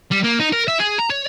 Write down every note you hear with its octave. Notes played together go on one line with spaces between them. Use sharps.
G3
A#3
D#4
A#4
E5
G#4
A#5
C#5